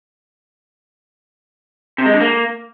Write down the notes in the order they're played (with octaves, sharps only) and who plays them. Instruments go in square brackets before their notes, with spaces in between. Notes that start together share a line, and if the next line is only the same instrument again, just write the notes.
[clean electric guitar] C3
G#3
D3
A#3